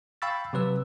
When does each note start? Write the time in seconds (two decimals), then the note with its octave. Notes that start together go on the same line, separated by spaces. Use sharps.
0.22 F5 G5 B5 C#6 E6 A6
0.53 C3 F#3 B4 E6